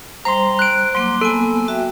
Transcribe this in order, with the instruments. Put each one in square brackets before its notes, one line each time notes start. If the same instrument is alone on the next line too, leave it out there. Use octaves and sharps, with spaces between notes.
[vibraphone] G3 C5 [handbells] A#5 C6
[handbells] F#6 D7
[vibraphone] F#3 A#3 D6 [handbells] C6
[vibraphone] A#3 B3 G#5 [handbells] A4
[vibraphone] F#4 E5 G5